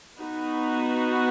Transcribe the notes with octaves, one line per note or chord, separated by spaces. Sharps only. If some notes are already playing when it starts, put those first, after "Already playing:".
B3 D#4 F#4 B4